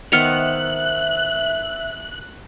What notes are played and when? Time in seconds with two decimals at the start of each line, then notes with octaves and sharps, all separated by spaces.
0.12 D#3 B3 C5 E5 F6 F#6 C#7 F7